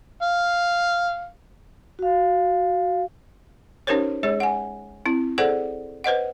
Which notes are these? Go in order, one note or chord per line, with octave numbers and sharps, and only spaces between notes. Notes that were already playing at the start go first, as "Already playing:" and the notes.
F5
F#4 F5
C#4 D#4 G4 A#4 C5 C#5
G#3 G#4 C#5
F#5 G#5
C4 E4
G#4 A4 C5 D5 F#5
B4 C5 D#5 F#5